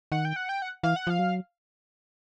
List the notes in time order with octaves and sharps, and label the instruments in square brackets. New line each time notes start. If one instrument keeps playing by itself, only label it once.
[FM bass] D#3 [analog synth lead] F#5
[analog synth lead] G5
F#5
G5
F#5
[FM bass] E3 [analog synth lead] F5
[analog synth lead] F#5
[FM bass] F3 [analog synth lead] F5
[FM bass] F#3